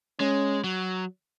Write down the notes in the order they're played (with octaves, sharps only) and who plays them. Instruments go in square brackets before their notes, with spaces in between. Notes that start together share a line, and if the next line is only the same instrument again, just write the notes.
[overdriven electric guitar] G#3 [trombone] C#4
[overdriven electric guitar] F#3